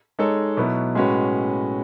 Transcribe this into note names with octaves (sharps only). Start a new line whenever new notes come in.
G#3 D#4 A4 C#5
B2 F#3 B3 E4
A2 G#3 C#4 F#4 B4